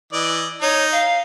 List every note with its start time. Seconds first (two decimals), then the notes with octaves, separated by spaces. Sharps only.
0.13 E3 D5 D#5
0.62 D#4 C#5
0.92 F5